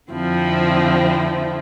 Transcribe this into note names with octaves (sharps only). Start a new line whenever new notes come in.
F2 D3 F3 C4 E4